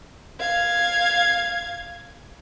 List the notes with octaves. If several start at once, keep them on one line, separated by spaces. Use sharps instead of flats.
F5 G#6